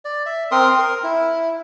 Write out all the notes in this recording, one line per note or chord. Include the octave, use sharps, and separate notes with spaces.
D5
E5
C4 A#4 C6 D#6
A#4
E4